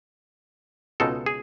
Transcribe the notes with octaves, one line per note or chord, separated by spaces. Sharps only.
C#2 B2 G#3 D#4 A4
G#4